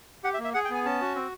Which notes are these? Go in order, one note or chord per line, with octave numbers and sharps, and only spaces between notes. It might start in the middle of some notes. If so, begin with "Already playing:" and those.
G4 F#5
E5
A#3
E5
G#4 F#5
G5
B3 G#5
C#4 A5
F#4
C4